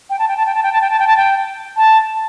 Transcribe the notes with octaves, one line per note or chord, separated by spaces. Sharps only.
G5
A5
G5
A5
G5
A5
G5
A5
G5
A5
G5
A5
G5
A5